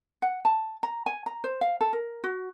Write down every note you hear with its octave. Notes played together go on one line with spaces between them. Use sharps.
F#5
A5
A#5
G#5
A#5
C5
F5
A4
A#4
F#4